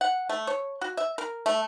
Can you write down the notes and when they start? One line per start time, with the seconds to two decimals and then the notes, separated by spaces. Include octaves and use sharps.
0.01 F#5
0.29 A3
0.47 C#5
0.81 F#4
0.97 E5
1.18 A#4
1.46 A3